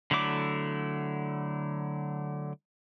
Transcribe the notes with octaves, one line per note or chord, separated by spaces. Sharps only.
D3 F#3 A3 E4 D6